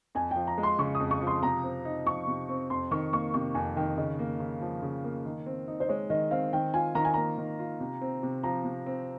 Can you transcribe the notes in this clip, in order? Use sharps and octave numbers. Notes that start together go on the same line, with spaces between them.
F2 G#5
F3 G5
A#5
G#3
C6
C#3 C#6
D#6
F2
C#6
F3
C6
C3 A#5
C4
D#4
F3 C#6
C3
C4
F2 C6
D#3 C#6
A#3 C#6
C3 C#6
F2 G#5
D#3 G5
C#3 D#5
A#3
C#3
F3
C#3
A#3
D#3
C4
D#4
C5
G#3 C#5
D#3 D#5
C4 F5
D#3 G5
F4 G#5
D#3 A#5
G#5
A#3 A#5
D#3
F4
C3
C4
C3
F3 A#5
C3
C4